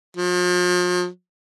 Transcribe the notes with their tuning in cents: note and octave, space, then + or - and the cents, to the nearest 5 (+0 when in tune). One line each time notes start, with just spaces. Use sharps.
F3 +40